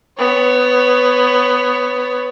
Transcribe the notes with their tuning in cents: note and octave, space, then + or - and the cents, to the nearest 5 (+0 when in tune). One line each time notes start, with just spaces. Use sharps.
B3 +15 C#5 +0